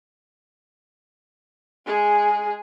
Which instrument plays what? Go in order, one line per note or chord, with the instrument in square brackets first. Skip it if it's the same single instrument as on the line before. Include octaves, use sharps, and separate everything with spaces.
[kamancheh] G#3 G#4